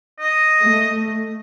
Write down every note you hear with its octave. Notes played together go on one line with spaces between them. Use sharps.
D#5
A3